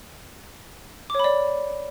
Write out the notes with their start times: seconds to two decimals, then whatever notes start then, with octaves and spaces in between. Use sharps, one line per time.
1.10 D6
1.15 C#5
1.19 B5
1.24 D5